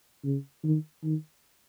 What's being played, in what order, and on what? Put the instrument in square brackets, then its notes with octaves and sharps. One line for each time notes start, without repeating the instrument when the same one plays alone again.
[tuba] C#3
D#3
D#3